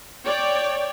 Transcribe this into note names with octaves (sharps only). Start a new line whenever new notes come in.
C#5 D5 G5